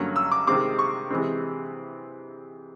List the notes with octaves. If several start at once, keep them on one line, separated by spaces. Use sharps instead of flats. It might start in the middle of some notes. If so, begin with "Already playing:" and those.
Already playing: G2 D3 F#3 A#3 C#4
E6
D6
C3 D#3 G#3 C4 D6
C#6
C3 E3 G#3 C4